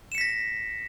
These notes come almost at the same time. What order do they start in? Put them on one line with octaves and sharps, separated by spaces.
E7 C#7 B6 A#6